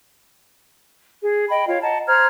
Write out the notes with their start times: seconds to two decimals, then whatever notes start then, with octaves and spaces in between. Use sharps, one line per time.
1.21 G#4
1.49 D#5 G5 B5
1.68 F4 C#5 F5
1.82 D#5 F#5 A5 A#5
2.07 C5 A#5 F6 G#6